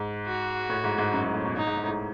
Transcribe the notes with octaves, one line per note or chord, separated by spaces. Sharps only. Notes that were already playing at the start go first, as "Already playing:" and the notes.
Already playing: G#2
F#4
A2
G#2
G#2
F#2
G#2
A2
B2
G#2 D#4
G#2
G#2
A2
G#2